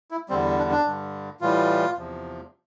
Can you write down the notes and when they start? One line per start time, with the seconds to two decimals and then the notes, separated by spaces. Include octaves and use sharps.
0.11 E4
0.29 E2 D3 G3 C4
0.58 D4
0.71 D4
0.85 G2 D3 G3
1.41 A2 E3 G3 F4
1.97 E2 C3 F3